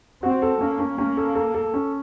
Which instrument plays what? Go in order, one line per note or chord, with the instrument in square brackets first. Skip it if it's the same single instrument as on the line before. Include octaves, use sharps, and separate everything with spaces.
[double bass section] C4 [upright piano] F#4
[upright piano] A4
[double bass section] A#3 [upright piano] C#4
[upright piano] C#4
[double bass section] A#3 [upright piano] C#4
[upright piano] A4
A4
A4
C#4